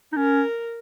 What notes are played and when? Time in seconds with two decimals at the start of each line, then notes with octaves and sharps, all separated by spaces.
0.13 D#4
0.17 C#4 A#4